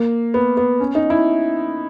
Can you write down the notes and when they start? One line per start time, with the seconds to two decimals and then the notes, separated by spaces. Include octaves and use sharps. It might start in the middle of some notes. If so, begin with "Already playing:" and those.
Already playing: A#3
0.34 B3
0.57 B3
0.80 C#4
0.95 D#4
1.10 E4